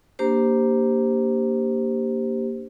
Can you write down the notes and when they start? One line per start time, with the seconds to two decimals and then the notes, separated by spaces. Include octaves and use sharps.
0.19 A#3 D4 G4 C5